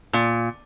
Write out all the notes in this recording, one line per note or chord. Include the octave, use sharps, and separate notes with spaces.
A#2